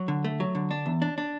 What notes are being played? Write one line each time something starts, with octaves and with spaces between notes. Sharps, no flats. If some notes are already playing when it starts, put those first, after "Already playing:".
Already playing: F#3
D3
A3
F#3
D3
D4
E2
D4
D4